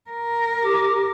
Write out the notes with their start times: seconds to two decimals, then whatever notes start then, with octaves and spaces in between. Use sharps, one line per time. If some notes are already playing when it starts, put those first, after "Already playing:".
0.10 A#4
0.63 G4 D6